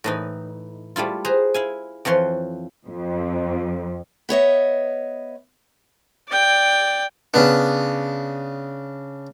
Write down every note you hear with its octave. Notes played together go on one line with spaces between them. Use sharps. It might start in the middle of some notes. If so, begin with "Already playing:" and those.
A2 E3 D#4
G3 A3 E4 F4
G#4 B4 C5 A#5
E4 F5 G#5
F2 E3 F3 C#5 C6
F2
B3 C#5 D#5 E5
D5 G5
C#3 B3 D4